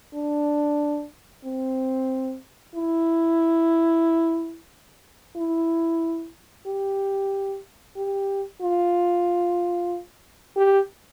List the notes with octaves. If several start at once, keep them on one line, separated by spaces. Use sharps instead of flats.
D4
C4
E4
E4
G4
G4
F4
G4